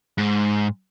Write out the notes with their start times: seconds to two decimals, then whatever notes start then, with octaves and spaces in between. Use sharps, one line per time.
0.18 G#2